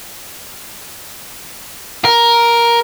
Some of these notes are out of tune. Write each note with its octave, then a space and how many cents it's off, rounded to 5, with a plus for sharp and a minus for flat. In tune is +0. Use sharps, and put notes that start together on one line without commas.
A#4 +10